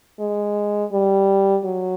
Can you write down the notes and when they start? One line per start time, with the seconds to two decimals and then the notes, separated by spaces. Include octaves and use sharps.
0.20 G#3
0.92 G3
1.65 F#3